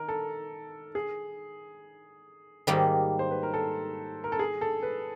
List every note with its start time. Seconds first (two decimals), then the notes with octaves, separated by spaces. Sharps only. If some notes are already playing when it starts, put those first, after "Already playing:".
Already playing: D#3 A#4
0.08 A4
0.95 G#4
2.67 G#2 D#3 G3 A#3 D#4
3.19 C5
3.31 B4
3.43 A#4
3.54 A4
4.24 A#4
4.32 A4
4.39 G#4
4.61 A4
4.83 B4